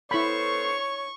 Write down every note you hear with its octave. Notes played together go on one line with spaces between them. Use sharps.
B3 E4 A4 C5 C#5 B5 C#6